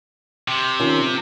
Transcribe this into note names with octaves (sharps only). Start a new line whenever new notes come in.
C3
D#3 C#4 F4
G#2 C#3 F3